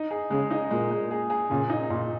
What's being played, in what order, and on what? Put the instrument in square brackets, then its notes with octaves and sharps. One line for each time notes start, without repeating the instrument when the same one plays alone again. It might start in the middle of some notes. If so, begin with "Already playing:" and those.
Already playing: [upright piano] D#4
G#4
[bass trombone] C#3 [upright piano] G#3
[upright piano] D#4
[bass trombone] A#2 [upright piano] G#3
[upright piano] G#3
G#4
G#4
[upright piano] A#2 [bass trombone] C#3
[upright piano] D#4
A#2